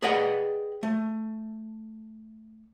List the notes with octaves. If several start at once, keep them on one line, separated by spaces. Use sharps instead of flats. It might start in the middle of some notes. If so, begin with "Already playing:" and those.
G#4 B4 D5 D#5 F#5 G5
A3